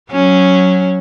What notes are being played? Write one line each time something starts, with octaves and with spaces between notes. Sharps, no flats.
F#3 C#4